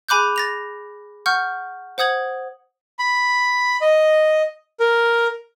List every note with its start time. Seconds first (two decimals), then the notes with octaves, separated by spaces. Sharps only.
0.09 G#4 G#5 B5 D6 F#6 G6
0.36 A6 A#6 F7
1.26 F#5 C#6 F6 G6
1.98 C5 F#5 D#6 G#6 F#7
2.99 B5
3.81 D#5
4.80 A#4